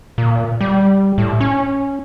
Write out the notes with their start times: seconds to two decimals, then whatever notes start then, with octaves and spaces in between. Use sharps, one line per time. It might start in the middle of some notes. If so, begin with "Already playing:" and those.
0.18 A#2
0.61 G3
1.18 A2
1.41 C#4